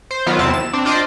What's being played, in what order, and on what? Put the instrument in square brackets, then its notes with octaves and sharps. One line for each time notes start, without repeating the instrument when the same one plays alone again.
[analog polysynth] C5
D#3 F#3 B3 F4
E2 C3 C4 E4 A5
E7
C4 D4
D4 F4 C5 D5 D#5